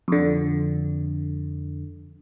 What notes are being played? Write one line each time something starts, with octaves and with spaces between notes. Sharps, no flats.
F2 D3